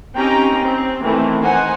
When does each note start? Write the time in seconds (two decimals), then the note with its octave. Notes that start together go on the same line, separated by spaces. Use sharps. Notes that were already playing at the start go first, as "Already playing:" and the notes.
0.15 C4 C#4 D#4 G4 G5 A#5
0.61 C4
1.04 D#3 E3 A3 C4
1.43 D#4 C5 F#5 G#5